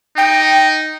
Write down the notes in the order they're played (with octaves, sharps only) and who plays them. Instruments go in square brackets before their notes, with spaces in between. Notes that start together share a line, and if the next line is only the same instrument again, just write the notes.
[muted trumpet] D#4 [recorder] G5